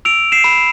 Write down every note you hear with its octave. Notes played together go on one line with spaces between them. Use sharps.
E6 D7 F7
C7 E7
B5